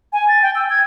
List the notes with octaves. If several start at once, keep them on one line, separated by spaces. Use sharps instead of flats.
G#5
A6
G5
E6
G#6